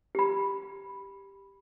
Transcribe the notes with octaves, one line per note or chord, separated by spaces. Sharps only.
G4 B5